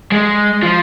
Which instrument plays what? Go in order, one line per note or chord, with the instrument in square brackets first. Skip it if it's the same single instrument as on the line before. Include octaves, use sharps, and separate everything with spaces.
[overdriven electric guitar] G#3
F3